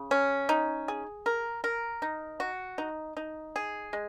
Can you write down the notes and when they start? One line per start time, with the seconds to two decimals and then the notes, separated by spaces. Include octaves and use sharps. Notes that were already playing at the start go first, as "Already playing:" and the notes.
Already playing: C#3
0.11 C#4
0.49 D#4
0.88 G#4
1.26 A#4
1.64 A#4
2.02 D#4
2.40 F#4
2.78 D#4
3.17 D#4
3.56 G#4
3.93 G#3